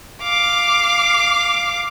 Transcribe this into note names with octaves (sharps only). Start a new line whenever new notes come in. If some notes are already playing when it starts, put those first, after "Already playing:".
F5 D6